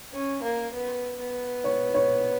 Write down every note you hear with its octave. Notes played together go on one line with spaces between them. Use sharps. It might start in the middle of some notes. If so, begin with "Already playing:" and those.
C#4
A#3
B3
B3
C#5
C#5